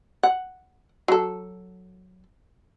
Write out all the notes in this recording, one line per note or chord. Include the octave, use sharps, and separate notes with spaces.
F#5
F#3 A4